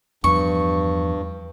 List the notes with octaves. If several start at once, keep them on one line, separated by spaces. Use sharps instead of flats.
E2 G2 F3 C#6